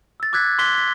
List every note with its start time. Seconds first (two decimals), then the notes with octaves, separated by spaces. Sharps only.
0.20 E6 A6
0.33 D6 E6 F#6 G#6 B6
0.58 C6 D6 F#6 B6 G7
0.78 B6